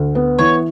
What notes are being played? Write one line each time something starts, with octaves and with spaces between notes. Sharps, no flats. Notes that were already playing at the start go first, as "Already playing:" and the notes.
Already playing: D2
B3
E3 C#5